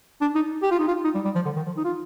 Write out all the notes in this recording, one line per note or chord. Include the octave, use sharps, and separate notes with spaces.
D4
D#4
G4
F4
D#4
F4
D#4
G3
G3
F3
D3
D#3
F3
D#4
F4